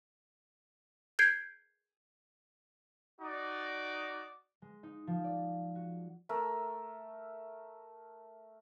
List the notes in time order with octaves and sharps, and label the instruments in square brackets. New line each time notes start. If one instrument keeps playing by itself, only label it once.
[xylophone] G6 G#6 C7 D7
[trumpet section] D#4 F#4 D5
[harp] G#3
D#4
F3
D5
F#4
[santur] A3 A#4 E5